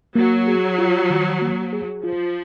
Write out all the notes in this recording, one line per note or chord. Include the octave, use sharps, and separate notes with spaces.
F#3 A#3
G#4
F4
D#3
A#3
G#4
F3 F4